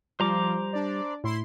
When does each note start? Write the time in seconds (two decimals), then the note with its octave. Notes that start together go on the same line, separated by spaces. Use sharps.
0.20 F3 G3 C5 A#5 D6
0.73 D4 D5
1.24 A2 E4 C6